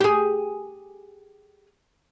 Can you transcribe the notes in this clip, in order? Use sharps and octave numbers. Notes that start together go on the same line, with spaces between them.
G4 G#4